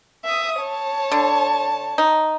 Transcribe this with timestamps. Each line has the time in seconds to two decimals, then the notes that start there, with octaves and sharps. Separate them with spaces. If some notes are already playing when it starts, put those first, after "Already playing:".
0.25 E5 D#6
0.61 C#5 A5
1.12 D3
1.98 D#4